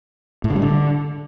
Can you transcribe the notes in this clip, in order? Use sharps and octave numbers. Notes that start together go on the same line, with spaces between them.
A2
D3
G3
D3